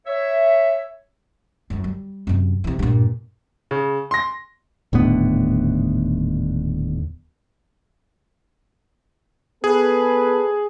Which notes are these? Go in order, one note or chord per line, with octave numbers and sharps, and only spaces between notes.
C#5 E5
F#2 F#3
G3
F#2 C3
C3 E3
G2 A#2
C#3
C6 A#6
D#1 A2 D3 B3
B3 G#4 A4 B4